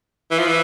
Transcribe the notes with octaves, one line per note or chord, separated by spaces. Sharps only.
E3
F3
E3